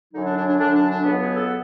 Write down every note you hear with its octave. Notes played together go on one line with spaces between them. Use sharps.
F#2 D3 F#3 D#4
D4
D4
D4
F#2 D3 F#3 D4
D4
D4
C#2 B2 F#3 B3
G#4
A4